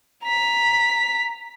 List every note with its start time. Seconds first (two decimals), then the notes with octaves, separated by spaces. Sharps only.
0.24 A#5 B6